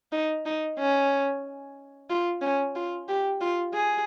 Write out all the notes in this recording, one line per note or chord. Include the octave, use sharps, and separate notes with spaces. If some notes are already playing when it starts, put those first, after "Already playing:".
D#4
D#4
C#4
F4
C#4
F4
G4
F4
G#4